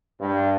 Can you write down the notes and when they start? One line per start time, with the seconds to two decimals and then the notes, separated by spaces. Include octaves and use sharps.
0.20 G2